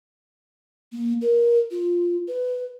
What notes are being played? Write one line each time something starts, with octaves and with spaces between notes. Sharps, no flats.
A#3
A#4
F4
B4